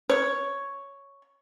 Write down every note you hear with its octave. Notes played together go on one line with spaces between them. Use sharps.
C#5